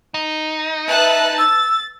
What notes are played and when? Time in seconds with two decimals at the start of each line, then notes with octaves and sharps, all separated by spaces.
0.14 D#4
0.89 B4 E5 A5 F#6
1.38 E6 A6